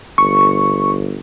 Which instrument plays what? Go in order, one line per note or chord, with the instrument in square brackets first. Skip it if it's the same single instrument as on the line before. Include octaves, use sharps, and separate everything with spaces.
[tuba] G1 [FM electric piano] C#6